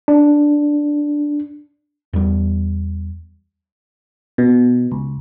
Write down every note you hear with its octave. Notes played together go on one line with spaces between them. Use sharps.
D4
E2 G3
B2
C#2